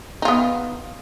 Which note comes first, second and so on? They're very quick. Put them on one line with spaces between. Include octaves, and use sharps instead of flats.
D#4 F4 B3